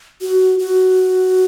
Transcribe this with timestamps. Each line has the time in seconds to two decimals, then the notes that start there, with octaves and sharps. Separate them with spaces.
0.21 F#4
0.59 F#4